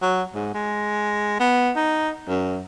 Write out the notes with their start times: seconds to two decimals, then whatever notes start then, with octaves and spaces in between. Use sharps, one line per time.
0.02 F#3
0.35 G#2
0.54 G#3
1.40 B3
1.76 D#4
2.28 F#2